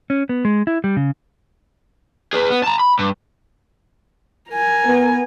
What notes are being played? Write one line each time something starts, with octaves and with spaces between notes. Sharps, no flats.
C#4
B3
G#3
E4
G3
C#3
G#4 B4
B3
A5 A#5
B5
G2
A#4 G#5
B3